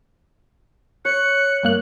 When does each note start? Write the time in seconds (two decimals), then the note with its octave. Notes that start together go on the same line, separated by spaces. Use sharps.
1.05 C#5 F#6 C#7
1.63 G2 A#3 F#6